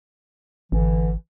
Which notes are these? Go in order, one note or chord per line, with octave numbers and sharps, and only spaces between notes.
G#1 D3 E3